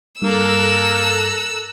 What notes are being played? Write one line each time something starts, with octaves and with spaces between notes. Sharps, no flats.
G2 A#3 A4 A#5 E6 F#6